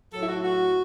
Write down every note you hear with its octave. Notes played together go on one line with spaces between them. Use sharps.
A2 F#3 A4
E4
F#4
F#4